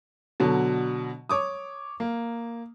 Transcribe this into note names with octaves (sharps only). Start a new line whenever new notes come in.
B2 D3 F#3
C#5 D6 D#6
A#3